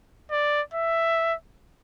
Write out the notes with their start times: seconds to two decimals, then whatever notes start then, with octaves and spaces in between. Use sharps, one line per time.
0.31 D5
0.74 E5